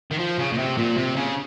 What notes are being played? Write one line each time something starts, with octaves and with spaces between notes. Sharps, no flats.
D#3
F3
C#3
A#2
C3
A#2
C3
C#3